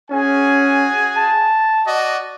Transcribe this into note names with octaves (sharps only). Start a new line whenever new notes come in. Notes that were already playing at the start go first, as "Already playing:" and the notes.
C#4 F#4 G#4 G#5
A5
F#4 D5 D#5